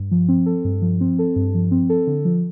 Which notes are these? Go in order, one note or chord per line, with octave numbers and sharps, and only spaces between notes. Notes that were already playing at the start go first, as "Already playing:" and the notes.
Already playing: G2
F3
C4
A4
G2
F3
C4
A4
G2
F3
C4
A4
D3
F3